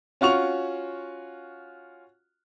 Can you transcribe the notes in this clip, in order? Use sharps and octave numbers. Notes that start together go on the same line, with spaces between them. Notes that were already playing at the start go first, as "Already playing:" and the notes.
C#4 F4 F#4 C#6 F7